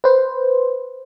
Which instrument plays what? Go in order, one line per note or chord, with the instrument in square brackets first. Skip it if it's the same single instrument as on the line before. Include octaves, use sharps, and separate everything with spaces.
[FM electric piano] B4 C5